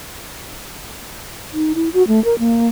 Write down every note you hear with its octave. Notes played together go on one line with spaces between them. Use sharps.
D#4
E4
F#4
A3
A#4
A#3